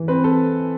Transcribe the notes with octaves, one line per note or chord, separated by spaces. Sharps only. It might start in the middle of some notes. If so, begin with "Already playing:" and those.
Already playing: E3
C4 B4
A4